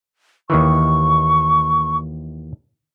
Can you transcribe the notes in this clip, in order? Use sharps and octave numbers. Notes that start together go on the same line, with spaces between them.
D#2 D#3 E3 C#6